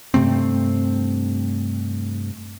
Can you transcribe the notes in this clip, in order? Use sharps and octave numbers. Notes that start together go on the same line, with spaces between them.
G2 C3 A3 C4